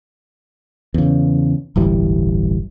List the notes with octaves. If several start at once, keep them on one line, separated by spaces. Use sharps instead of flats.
E2 C#3
D1 G1 E3 G3